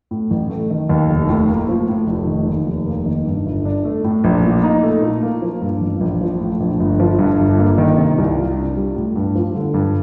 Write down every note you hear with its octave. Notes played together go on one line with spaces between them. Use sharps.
A2
A1
A3
D#3
D#2
F1
A2
A#3
F3
A2
F1
D#3
D#2
F1
A#3
D#3
G2
G1
D4
A3
A2
A#1
A#2
D#4
A3
A#2
A#3
F3
G2
A1
A#1
F3
A2
A#1
G1
F3
G2
G1
A#3
D#3
C3
C2
F4
D4
G3
A2
G2
F3
D3
G2